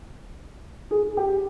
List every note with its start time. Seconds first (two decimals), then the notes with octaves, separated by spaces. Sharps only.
0.91 G#4
1.17 G4